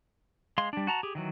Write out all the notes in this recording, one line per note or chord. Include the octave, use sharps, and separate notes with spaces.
G#3 F5 C6
G3 D4
F#4 A5 A#5
G4 G#4
D#3 E3 F#3